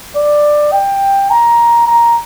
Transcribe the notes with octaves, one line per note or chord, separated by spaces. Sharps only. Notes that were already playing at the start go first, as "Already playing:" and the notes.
D5
G5
A#5
A#5